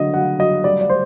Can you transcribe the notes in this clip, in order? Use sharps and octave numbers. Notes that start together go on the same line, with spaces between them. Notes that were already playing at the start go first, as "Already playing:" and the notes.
Already playing: D3 F#3 D#5
F#3 F#5
F#3 D#5
G3 D5
D5
C5